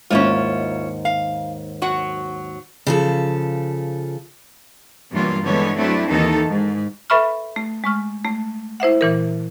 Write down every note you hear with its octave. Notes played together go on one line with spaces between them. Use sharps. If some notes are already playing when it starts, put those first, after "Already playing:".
D#2 G#2 C#4 E4 F4
F5
F#3 F#4 F#5
C#3 F3 A4
G2 B2 E3 F#3 A#3 F4
D3 E3 G#3 B3 C#5
F#3 A3 C4 D4 E4
D#2 D#3 E3 D#4 A4
G#2
A4 B4 E5 B5 C#6 F6
A3
G#3 C#6 F6
A3
E4 C5 E5 F#5
A#2 E3 A#4